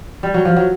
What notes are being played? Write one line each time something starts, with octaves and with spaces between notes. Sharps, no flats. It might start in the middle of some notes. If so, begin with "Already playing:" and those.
G3
F#3
F3
F#3